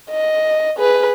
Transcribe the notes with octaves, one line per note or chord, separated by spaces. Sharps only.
D#5
G#4 B4